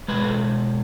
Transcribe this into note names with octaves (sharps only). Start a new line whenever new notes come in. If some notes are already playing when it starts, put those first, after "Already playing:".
B2 G#3 B4
A4